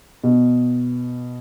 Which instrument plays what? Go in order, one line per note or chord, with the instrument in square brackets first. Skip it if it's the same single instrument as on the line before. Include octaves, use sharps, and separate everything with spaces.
[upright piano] B2